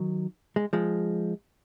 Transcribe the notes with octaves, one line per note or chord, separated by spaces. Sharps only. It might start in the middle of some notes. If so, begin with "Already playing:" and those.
Already playing: D#3 F#3
G#3
F3 G#3